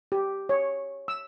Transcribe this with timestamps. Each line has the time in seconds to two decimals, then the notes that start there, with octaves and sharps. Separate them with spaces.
0.12 G4
0.49 C#5
1.08 E6